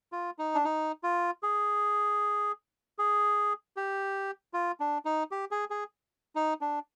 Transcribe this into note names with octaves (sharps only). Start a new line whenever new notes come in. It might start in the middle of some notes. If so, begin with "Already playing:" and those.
F4
D#4
D4
D#4
F4
G#4
G#4
G4
F4
D4
D#4
G4
G#4
G#4
D#4
D4